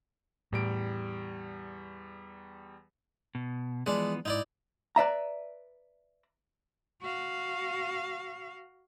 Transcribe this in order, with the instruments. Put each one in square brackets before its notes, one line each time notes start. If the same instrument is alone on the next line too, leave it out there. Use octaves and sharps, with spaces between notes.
[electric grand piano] E2 G3 D7 [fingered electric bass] A2
[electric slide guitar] B2
[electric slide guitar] E3 F3 B3 [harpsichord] G#3 D4
[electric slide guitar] G#2 [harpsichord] D#4 E4 D5
[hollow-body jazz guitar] B4 D5 E5 A#5
[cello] F#4 F5